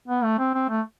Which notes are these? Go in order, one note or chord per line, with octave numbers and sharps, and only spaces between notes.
B3
A3
C4
C4
A3